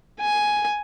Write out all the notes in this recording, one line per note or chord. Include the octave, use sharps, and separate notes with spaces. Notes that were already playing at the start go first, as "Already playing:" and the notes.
G#5